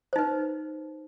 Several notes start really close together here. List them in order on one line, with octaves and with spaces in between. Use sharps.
C5 D#4 B4